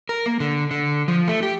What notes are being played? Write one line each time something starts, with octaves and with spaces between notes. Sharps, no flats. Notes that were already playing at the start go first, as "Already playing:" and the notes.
A#4
A#3
D3
D3
F3
A3
G4